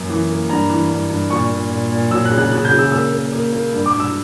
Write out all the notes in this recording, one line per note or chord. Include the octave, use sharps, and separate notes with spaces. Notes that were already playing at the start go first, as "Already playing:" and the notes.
Already playing: F#2 A#3
E3
A#3
G2 A#5
E3
G2
G2
A#2 C#6
A#2
A#2
A#2
F#3 E6
F#6
C#3
F#6
C#3 F#6
G6
C#3
E6
A#3 E6
A#3
A#3
A#3
G2
D6
G2
E6